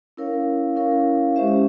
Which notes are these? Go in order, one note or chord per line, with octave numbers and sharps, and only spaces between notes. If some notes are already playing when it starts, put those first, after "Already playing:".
C#4 E4 A#4 C#5 F5
C#4 E4 A#4 C#5 F5
G#3 C#4 G4 C5 E5